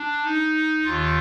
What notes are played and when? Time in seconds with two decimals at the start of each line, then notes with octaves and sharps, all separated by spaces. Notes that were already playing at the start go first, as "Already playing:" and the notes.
Already playing: D4
0.24 D#4
0.84 D#2 D#3 F4